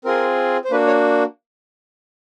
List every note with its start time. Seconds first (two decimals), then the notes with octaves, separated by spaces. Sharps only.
0.05 C4 F4 G#4 A#4
0.64 C5
0.71 A#3 D4 F#4 B4
0.87 C#5